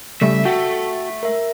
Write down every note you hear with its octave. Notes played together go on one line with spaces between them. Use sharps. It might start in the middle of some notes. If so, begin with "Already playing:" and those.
C#3 G3 A3 A4 E5
A3 F#4 G5
A#4 E5